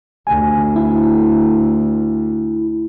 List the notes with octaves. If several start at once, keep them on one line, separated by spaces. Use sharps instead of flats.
D2 G#5
E4